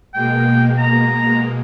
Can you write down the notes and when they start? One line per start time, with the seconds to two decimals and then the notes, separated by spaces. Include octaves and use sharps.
0.14 B2 G#3 A#3 G5
0.78 A#5